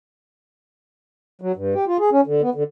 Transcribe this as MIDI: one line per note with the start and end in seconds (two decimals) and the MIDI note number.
1.42 1.52 54
1.56 1.74 43
1.74 1.85 67
1.87 1.97 65
1.99 2.10 68
2.12 2.21 61
2.26 2.42 50
2.42 2.50 59
2.55 2.63 50